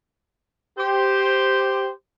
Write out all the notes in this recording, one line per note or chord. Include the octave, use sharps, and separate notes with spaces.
G4 C5